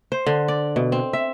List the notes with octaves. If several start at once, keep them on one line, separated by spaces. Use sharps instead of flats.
C5
D3
D5
B2
C4
E5